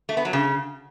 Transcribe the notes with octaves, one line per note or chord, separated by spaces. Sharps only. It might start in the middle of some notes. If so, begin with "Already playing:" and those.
A3
B3
F#3
C#3